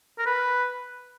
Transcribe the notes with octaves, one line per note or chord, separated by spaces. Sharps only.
A#4
B4